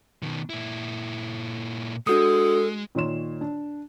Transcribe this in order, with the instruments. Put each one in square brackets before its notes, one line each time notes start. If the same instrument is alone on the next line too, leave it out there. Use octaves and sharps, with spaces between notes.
[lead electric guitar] B2 D#3
A#2 E4
[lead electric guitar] G#3 [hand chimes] D4 F#4 D#6 [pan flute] A4
[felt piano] A#2 D#3 C#5 C6 E7
D4